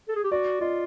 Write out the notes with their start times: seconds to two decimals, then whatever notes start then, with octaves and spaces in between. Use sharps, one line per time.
0.08 A4
0.16 G#4
0.24 G4
0.32 F#4 D5
0.61 F4 D#5